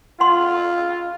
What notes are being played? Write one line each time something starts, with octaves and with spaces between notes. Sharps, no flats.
F4 F#5 C6